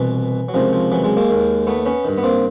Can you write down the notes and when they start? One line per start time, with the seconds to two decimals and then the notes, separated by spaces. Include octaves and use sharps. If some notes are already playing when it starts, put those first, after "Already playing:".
Already playing: C2 B2 E3
0.49 F#3
0.54 C#2 C3 D#3 F3
0.73 F3
0.92 E3 F#3
1.04 F#3 G#3
1.17 G#3 A#3
1.30 D#2 D#3
1.67 A3 B3
1.85 B3 C#4
2.05 G2 D#3
2.18 B3
2.23 A#3 C4